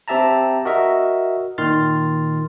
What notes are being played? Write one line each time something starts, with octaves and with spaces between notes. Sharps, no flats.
C4 G4 E5 A5 A#5
F#4 A#4 D#5 E5
A#2 D#3 C6 F6 A6